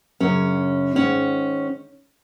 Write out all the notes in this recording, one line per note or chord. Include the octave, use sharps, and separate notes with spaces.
F#2 C#3 C#4
G#2 D#3 C#4